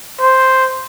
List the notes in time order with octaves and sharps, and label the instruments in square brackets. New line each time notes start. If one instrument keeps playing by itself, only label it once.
[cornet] C5